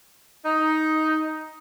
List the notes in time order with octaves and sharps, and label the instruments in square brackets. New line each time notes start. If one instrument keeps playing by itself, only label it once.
[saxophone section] D#4